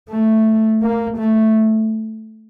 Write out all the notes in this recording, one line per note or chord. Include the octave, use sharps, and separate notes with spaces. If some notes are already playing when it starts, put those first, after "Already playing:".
A3
A#3
A3